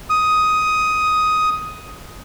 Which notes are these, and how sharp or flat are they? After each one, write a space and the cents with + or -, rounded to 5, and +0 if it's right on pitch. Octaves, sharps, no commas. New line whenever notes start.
D#6 +10